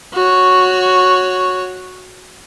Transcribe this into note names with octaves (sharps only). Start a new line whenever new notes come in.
F#4 C#5